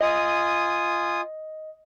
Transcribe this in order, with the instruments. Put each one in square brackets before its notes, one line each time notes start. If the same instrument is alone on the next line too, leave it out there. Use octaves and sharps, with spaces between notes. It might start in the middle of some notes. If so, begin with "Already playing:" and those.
[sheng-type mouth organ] F4 G#5 D#6 [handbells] D#5